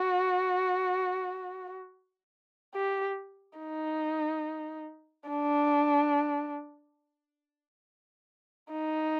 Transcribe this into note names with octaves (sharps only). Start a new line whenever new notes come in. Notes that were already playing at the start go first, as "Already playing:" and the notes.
Already playing: F#4
G4
D#4
D4
D#4